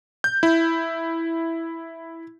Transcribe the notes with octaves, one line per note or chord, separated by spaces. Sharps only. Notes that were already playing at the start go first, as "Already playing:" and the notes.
G6
E4